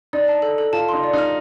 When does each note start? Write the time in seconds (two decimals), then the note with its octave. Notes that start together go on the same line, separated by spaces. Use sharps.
0.13 D#4 D5
0.28 A5
0.42 A4
0.58 A4
0.73 F4 A5
0.89 D#4 C6
1.03 D5
1.13 D#4 F6